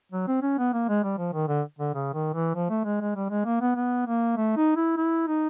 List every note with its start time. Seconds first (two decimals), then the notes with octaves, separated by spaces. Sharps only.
0.12 F#3
0.28 C4
0.42 C#4
0.58 B3
0.73 A#3
0.89 G#3
1.04 G3
1.18 F3
1.33 D#3
1.48 D3
1.79 D3
1.94 C#3
2.14 D#3
2.34 E3
2.55 F3
2.70 A3
2.85 G#3
3.01 G#3
3.16 G3
3.30 G#3
3.45 A#3
3.61 B3
3.76 B3
4.07 A#3
4.37 A3
4.57 D#4
4.76 E4
4.97 E4
5.27 D#4